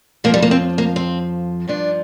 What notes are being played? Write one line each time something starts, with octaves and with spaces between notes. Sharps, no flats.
F2 F3 A#3
G3
A#3
C4
A#3
C4
G2 F3 D4